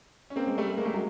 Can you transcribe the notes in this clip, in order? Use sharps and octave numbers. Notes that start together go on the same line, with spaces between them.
C#4
A#3 C4
G#3 A#3
G3 A3
G#3 A#3
G3 A3
F#3 G#3